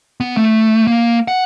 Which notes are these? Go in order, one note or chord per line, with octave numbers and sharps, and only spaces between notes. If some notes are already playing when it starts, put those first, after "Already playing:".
B3
A3
A#3
F#5